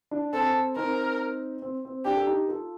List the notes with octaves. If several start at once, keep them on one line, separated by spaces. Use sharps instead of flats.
D4
C4 A4
C4 D#4 A#4
C4
C4
D4 G4
A4
D#4 G4
F4 A4